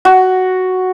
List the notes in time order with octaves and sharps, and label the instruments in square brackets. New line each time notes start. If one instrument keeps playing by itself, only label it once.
[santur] F#4